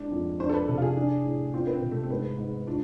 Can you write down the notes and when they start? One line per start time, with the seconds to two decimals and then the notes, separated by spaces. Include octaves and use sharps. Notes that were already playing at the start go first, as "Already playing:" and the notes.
Already playing: G#2 D4
0.11 F2
0.40 D4 C5
0.49 A4
0.54 B4
0.68 C3 A4
0.78 F4
0.82 G#4
0.96 D4
1.24 A2
1.54 C4 F4
1.67 B3
1.72 C4
1.82 C3
1.91 A3
2.03 C4
2.10 G#2 B3
2.38 G#2
2.67 D4 F4